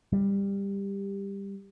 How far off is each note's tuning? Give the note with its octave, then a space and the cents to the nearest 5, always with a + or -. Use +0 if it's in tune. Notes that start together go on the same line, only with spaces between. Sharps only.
G3 +15